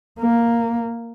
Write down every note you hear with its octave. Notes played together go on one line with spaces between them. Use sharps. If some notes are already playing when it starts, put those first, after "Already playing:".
A#3